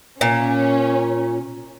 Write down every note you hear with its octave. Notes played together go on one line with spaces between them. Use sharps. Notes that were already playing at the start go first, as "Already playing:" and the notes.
A#2 C#4